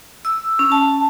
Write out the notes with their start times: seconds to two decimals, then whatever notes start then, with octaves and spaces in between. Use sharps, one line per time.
0.25 E6
0.59 C#4
0.72 A5